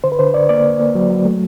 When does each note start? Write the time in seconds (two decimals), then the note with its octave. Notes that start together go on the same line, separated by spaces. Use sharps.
0.04 D3 C5
0.12 B4
0.19 D3 C5
0.34 D3 D5
0.49 A#3 D5
0.65 D3
0.80 A#3
0.95 F#3
1.11 F#3
1.25 A3